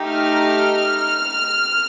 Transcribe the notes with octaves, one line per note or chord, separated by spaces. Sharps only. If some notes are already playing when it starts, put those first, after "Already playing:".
Already playing: A3 D#4 G4
F6